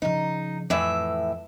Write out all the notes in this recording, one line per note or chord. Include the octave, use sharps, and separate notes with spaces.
C#3 F3 D#4
F2 A2 E3 E5